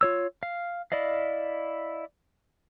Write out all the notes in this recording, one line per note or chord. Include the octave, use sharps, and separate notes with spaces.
F4 C#5 E6
F5
E4 D5 D#5 F5